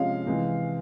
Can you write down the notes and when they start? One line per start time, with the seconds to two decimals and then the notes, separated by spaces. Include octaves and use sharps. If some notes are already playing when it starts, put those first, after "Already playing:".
Already playing: C3 F3 G#3 C#4 F5
0.27 C3 E3 G#3